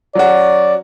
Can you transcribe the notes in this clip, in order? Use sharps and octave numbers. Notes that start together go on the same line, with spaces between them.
F#3 C#4 F#4 D5